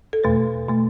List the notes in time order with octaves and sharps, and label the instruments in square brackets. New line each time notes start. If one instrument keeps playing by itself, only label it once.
[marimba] A4
E2 B2 A3 B4
B2 A3